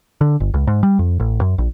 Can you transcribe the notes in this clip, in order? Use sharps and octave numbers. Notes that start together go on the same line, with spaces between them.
D3
G1
C#2
G#2
G3
F2
A1
F#2
A#1